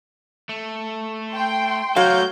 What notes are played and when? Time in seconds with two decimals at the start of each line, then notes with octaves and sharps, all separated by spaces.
0.49 A3
1.31 G5 C6
1.96 F#3 A3 C5 F5 G6